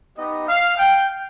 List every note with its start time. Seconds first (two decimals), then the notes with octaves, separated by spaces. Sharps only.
0.17 B3 D#4 G4 D#5
0.48 F5
0.78 G5